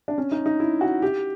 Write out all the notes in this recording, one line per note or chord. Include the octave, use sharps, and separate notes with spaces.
D4
C#4
D#4
D#4
E4
F#4
G4